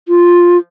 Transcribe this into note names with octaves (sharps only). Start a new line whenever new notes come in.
F4